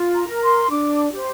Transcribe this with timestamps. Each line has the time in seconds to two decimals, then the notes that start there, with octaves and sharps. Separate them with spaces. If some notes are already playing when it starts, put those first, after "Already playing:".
Already playing: F4
0.14 A#5
0.28 A#4
0.42 C6
0.70 D4 D6
1.12 G4 C5